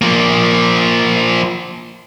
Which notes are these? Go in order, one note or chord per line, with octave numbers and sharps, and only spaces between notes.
F3 A#3